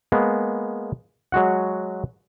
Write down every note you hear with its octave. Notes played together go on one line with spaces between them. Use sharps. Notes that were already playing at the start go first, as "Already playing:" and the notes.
G#3 A#3 B3
F#3 G#3 F#4 F#5